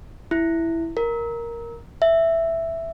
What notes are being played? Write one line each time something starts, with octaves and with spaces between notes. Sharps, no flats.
E4
A#4
E5